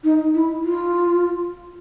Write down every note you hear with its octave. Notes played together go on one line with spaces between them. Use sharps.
D#4
E4
F4